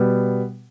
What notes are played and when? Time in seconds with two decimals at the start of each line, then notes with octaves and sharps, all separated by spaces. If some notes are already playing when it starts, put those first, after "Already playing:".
Already playing: B2 G3 B3